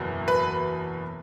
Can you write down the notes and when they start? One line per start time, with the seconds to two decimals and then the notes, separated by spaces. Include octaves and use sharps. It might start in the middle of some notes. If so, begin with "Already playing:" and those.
Already playing: F#1 E2 B2 F#3
0.28 B4